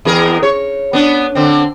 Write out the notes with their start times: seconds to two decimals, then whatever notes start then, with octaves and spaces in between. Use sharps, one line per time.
0.05 E2 G#4 A#4
0.43 C#5
0.93 B3 D4
1.35 D3 C4